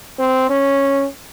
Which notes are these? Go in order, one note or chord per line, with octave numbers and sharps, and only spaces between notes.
C4
C#4